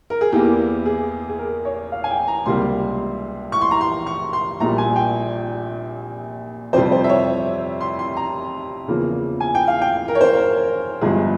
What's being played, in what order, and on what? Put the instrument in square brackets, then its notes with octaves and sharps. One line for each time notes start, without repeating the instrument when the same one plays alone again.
[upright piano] A#4
G#4
E2 E3 A#3 G4
G#4
G#4
A#4
C#5
F5
G#5
G5
A#5
C#2 C3 G3 A#3 C6
C#6
C6
A#5
C6
C#6
C6
A#1 A#2 G3 A#5
G#5
G5
F2 C3 G3 C5
C5
E5
C#5
C6
C6
A#5
E2 C#3 F3 A#3
G#5
G5
F5
G5
A#4
C#5
C5
A#4
G1 G2 F3 G#3 G#4